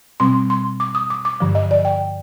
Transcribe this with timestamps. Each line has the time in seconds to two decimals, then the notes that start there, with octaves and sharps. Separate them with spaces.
0.20 B2 G3 C4 C6
0.50 C6
0.80 D6
0.95 D#6
1.10 D6
1.25 D6
1.40 G2 D3 F3
1.55 D#5
1.71 D5
1.85 G5